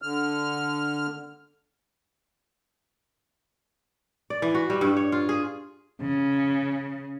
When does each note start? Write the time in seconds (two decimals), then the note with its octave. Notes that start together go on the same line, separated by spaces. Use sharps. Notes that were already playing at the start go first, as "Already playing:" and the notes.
0.02 D3 F6
4.30 D5
4.42 E3
4.55 F#4
4.70 G3
4.81 G2
4.97 C#5
5.12 F4
5.29 G#4
6.02 C#3